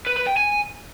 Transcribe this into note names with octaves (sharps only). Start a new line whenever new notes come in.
B4
B4
G5
G#5